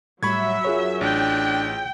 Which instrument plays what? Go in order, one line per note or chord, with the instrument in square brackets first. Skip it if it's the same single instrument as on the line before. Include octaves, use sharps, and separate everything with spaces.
[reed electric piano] A2 G3 [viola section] F#3 E5 [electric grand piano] B5 C#6 G#6
[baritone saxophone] F#2 [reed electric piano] F4 G#4 C#5
[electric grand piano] A1 [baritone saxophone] D4 [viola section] G5